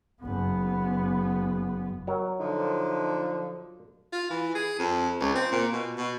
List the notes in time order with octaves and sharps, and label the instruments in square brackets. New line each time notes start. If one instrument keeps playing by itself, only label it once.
[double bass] F#1 B3
[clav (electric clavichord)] F#3 A#4
[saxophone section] D3 F3 [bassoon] D#4
[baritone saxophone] F4
E3
G#4
F2
C#2
C4
A#2
B2
B2